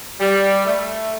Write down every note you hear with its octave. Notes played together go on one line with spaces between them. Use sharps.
G3
A3